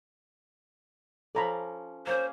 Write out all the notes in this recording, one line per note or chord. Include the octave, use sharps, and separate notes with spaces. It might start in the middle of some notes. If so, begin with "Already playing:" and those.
F3 C#4 A4 D5 A#5 B5
A#3 C#4 G#4 C5